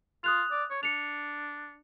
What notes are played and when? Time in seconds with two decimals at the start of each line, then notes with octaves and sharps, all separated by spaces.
0.24 F4 D#6 F#6 F7
0.51 D5
0.70 C#5
0.83 D4 C#7 F7